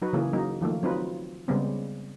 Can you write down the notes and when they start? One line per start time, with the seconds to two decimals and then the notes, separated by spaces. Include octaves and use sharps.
0.02 F#3 D#4 F#4 B4
0.13 C#3 E3 A#3 C#4 G#4
0.33 F#3 A#3 D#4
0.61 D#3 F3 A3 A#3
0.83 F#3 C4 D#4 F4 B4
1.48 C#3 G3 G#3 B3 C4